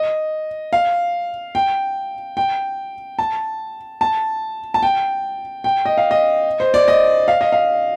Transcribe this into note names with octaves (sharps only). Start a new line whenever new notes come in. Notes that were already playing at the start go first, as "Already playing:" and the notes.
Already playing: D#5
F5
G5
G5
A5
A5
A5
G5
G5
D#5
F5
D#5
C5
D5
D#5
F5
D#5
F5